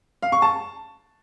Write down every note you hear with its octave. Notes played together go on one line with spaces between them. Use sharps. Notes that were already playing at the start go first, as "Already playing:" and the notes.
F5
C#6
A5